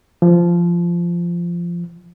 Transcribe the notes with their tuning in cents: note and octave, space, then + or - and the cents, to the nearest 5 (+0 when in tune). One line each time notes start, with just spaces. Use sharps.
F3 -15